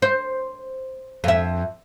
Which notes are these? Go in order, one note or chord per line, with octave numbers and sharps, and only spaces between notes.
C5
F2 E5